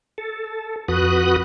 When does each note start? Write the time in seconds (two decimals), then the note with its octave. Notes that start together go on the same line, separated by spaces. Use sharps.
0.18 A4
0.88 F2 F#4 B4 D#6 F#6